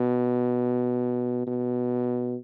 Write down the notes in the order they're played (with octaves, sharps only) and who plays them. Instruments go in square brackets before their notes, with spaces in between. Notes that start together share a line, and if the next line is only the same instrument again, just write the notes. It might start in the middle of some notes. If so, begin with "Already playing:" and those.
Already playing: [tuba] B2
B2